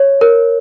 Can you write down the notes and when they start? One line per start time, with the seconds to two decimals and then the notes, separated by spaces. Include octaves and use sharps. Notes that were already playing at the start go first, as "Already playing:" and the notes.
Already playing: C#5
0.21 A#4